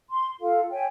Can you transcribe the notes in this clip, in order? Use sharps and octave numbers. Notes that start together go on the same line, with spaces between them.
C6
F4 A4 F5
C#5 E5 G5 G#5